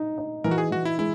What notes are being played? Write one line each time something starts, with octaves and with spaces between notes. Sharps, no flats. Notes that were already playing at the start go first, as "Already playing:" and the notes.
Already playing: D#4
D#4
E3 A#4
F#4
G#4
E3 F#4
E4
G#3 E4